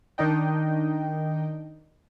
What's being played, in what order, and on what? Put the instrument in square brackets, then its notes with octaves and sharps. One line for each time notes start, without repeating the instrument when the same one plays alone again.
[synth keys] D#3 D4 D#4 D#5 G5